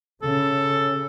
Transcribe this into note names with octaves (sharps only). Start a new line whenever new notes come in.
C#3 A4